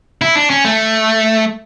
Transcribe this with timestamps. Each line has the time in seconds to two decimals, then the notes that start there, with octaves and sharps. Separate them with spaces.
0.22 E4
0.35 D4
0.50 C#4
0.65 A3